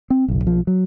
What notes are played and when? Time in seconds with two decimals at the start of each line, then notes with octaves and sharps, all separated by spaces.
0.10 C4
0.28 F#1 B1
0.44 B1 F3
0.67 F#3